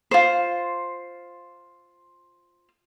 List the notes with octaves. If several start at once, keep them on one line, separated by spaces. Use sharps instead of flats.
F4 C5